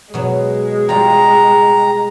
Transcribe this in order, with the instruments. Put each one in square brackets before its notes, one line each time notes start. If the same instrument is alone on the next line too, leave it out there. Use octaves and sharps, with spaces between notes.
[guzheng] B2 F#3 [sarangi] G#3
[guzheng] G3 F4 [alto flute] G5 [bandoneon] A#5